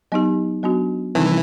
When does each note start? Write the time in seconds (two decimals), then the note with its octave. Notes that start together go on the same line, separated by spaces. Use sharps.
0.12 F#3 B3 D#4 G4
0.63 F#3 B3 D4 F#4
1.15 C3 D#3 E3 G3 C4 D#4